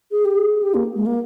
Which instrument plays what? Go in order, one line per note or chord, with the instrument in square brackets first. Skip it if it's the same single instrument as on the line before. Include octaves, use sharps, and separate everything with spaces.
[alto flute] G#4
G4
G#4
G4
A#3
G#3
A#3